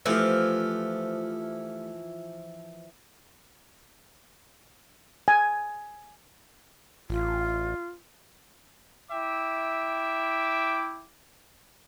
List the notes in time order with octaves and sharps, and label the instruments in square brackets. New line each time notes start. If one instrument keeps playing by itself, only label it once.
[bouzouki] E3 F3 [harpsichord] A3 G4
[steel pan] G#5
[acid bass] A1 [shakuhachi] F4
[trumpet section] E4 E5 G5 D6